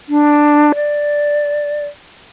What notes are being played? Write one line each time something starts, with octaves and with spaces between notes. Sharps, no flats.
D4
D5